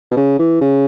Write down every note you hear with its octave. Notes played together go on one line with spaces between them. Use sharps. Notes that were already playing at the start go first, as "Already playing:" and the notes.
B2
C#3
E3
C#3